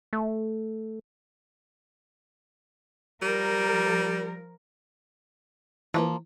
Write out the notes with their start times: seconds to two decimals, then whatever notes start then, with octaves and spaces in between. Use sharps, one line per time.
0.13 A3
3.22 F3 G3 A#4
5.94 E3 F3 A3 A#3